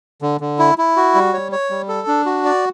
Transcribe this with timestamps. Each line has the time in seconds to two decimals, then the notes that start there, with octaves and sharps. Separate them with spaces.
0.22 D3
0.41 D3
0.59 E4
0.78 E4
0.97 F#4
1.15 G3
1.33 C#5
1.52 C#5
1.70 G3
1.89 A4
2.07 D4
2.26 F#4
2.45 D5